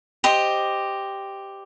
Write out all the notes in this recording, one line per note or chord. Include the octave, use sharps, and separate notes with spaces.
G4 C5 D#5